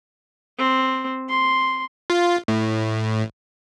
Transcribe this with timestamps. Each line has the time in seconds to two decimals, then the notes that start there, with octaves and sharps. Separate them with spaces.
0.58 C4
1.29 C6
2.10 F4
2.48 A2